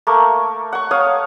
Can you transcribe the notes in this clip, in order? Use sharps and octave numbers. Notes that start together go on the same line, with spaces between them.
A3 A#3
F#5 C#6
C#5 F5 D#6